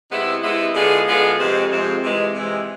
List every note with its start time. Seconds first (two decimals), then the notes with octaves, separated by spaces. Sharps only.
0.11 C3 G#3 B3 E4
0.43 C3 G#3 B3 E4
0.74 D3 G#3 B3 F4 G#4
1.07 D3 G#3 B3 F4 G#4
1.39 F2 C3 F3 G#3 C4
1.70 F2 C3 F3 G#3 C4
2.02 C3 E3 G#3
2.34 C3 E3 G#3